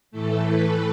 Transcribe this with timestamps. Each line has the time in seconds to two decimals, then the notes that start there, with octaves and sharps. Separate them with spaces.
0.11 A2 E3 A3 A4
0.47 B4